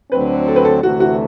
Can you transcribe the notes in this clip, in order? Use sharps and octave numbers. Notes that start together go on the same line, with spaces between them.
D2 D3 F#3 C4 B4
A4
B4
A4
D2 C3 E3 A3 F#4
F#4